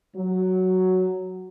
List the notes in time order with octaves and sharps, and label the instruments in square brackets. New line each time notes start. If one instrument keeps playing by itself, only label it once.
[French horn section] F#3